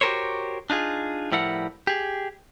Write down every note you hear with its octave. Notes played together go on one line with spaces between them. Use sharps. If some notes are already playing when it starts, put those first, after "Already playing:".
F#4 G4 A4 A#4 C5 C#5
D4 D#4 F4 G#4
A2 F3 G3 E4 A#4 F#5
G4 G#4